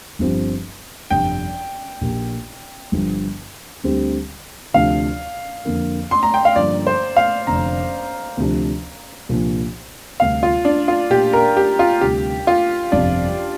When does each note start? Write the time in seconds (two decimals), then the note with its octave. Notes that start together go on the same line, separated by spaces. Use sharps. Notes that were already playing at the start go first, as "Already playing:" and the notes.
0.19 G1 G2 F3 C4 G4
1.10 G1 F2 C3 G5
2.01 A#1 A#2 A#3 G4
2.92 G1 G2 D3 F3
3.84 D2 D3 G3 C4 G4
4.74 D2 C3 F3 D4 F4 F5
5.65 F2 D3 A#3
6.11 C6
6.23 A#5
6.34 G5
6.45 F5
6.56 G2 D3 F3 A#3 F4 D5
6.87 C5
7.16 F5
7.47 F1 F2 D3 A#5
8.37 D2 C3 F3 D4
9.29 C2 A#2 F3 D4 F4
10.19 D2 C3 G3 D4 F5
10.43 F4
10.65 D4
10.88 F4
11.10 A#2 A#3 D4 G4
11.33 A#4
11.57 G4
11.79 F4
12.01 D2 C3 G3 G4
12.47 F4
12.92 G1 F2 C3 D4